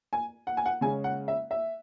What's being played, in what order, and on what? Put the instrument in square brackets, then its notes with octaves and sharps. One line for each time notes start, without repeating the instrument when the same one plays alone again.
[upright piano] G#5
F#5
G#5
F#5
C#3 G#3 C#4 G#5
F#5
E5
E5